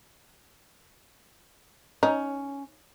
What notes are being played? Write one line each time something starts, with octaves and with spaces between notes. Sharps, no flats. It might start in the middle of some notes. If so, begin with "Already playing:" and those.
C#4 D#4